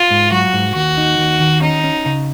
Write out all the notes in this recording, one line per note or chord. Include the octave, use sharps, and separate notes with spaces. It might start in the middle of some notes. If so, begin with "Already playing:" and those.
Already playing: F4
G#2
F#3 F#4
G#2
D#2 F#4
D#4
D#2
D#3
C#4 D#4
C#4
C#3